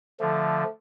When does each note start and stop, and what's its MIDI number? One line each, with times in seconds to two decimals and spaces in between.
0.20 0.64 50
0.20 0.64 53
0.20 0.69 57